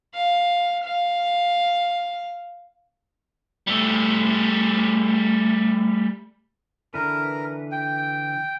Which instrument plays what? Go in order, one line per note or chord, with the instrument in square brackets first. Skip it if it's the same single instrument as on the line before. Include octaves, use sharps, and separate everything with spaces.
[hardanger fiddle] F5
F5
[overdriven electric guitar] G3 A3
[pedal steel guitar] D3 E3 B4 [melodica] A#4
[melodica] G5